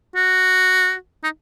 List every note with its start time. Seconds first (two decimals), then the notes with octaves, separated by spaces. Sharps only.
0.16 F#4
1.24 D#4